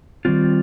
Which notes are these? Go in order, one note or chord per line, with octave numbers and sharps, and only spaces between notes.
D#3 G3 C4 F4